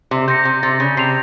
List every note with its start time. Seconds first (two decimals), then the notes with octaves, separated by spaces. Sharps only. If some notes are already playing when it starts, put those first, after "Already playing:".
0.11 C3
0.28 C3 G6 A#6 C#7
0.45 C3
0.63 C3 A6
0.80 C#3
0.97 C3 C7 F7